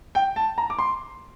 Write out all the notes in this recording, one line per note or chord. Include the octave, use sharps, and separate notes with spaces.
G5
A5
A#5
D6
C6